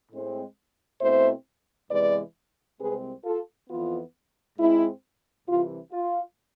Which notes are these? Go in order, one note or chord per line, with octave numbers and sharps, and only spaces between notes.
A2 G#3 C4
B2 A3 C4 E4 C5 E5
E2 C3 E3 G#3 B4 D5
C2 C3 G#3 C4 G#4 B4
F4 A4
F2 E3 B3 F4
G#2 G#3 C4 E4
C2 C3 E3 F4
F4